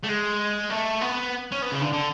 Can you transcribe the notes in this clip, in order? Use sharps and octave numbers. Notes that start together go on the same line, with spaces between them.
A3
G#3
A3
B3
C#4
B3
C#3
D3
D3